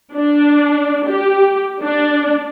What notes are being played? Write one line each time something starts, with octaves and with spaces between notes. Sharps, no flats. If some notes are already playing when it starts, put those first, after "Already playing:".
D4
G4
D4